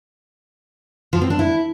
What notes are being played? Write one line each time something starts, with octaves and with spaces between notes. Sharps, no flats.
F3
C4
D4
E4